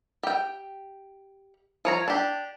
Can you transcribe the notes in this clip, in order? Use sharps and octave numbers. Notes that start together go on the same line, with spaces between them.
G4 G5
F3 C#5 A#5
D4 G4